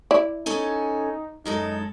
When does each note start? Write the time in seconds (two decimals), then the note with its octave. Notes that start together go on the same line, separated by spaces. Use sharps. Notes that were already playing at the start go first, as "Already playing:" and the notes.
0.11 E4 D5
0.46 C#4 D#4 A4 G#5
1.45 F#2 G#3 D#4 A4